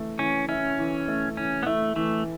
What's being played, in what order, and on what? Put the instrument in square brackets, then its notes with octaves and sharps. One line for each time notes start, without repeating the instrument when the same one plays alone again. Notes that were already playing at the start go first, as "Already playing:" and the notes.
Already playing: [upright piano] E3 A3
[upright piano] E3 [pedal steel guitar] C#4
[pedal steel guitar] C#4 [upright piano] E4
[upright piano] E3
A3
[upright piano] E3 [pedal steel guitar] C#4
[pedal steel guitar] B3
[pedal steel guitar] A3 [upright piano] E4
[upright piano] E3 [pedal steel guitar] A3